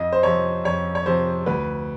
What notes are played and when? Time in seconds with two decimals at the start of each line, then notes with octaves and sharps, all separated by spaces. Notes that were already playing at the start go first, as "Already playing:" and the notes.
Already playing: F2 D#5
0.12 C5
0.23 C3 F3 C#5
0.64 F2 C#5
0.95 C#5
1.06 C3 F3 C5
1.46 D2 B4